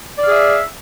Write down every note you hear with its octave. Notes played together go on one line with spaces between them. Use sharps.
G#4 D5 E5 F5